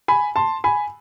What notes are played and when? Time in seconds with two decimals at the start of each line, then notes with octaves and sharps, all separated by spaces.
0.08 G#5 B5
0.36 A5 C6
0.64 G#5 B5